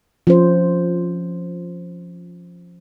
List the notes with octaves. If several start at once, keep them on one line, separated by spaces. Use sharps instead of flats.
F3 C#4 C5